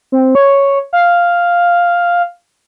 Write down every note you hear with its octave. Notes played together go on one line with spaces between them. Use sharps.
C4
C#5
F5